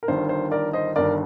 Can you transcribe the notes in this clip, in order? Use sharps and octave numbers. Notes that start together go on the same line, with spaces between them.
A#4
G1 G2 D#3 C5
C5
A#4 D5
C5 D#5
G1 G2 D#3 A#4 D5